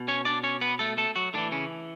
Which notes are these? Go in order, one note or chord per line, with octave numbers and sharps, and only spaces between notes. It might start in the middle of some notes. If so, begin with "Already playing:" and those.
Already playing: B2
C#4 C#5
D4 D5
C#4 C#5
B3 B4
A3 A4
A3 A4
F#3 F#4
A2 D3 E3 D4
C#3 C#4